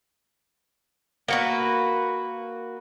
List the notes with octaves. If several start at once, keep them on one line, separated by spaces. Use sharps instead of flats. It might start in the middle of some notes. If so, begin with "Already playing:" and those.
A#3 F#4 B4